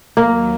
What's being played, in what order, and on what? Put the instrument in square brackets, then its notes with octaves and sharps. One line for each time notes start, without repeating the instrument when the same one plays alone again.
[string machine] D#2 D#3 F#3 [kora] A#3